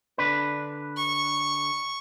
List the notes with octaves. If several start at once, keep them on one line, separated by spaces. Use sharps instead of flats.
D3 D4 B4
C#6